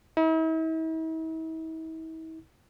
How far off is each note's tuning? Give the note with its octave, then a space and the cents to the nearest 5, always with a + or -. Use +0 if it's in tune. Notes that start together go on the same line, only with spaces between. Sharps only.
E4 -45